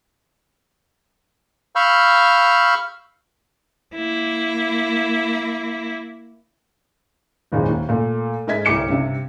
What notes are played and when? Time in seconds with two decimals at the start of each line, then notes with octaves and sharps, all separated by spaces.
1.76 F5 B5 C#6 E6 F6 G6
3.95 A#3 E4
7.52 F#1 D#2 A#2 G#3
7.69 D#2
7.89 A#2 A3
8.47 G#2 A#4 D#5 E5 G#6 B6
8.65 G1 C2 G3 D6 C#7 E7
8.89 G2 C3